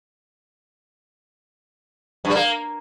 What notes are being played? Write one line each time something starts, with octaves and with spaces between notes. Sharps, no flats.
G2
G3
A#3